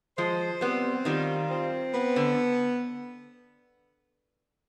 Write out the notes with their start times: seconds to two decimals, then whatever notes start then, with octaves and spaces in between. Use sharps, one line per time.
0.18 F3 G#3 C5
0.61 G3 B3 C4
1.05 D#3 G3 F4
1.49 C4
1.93 B3
2.16 D3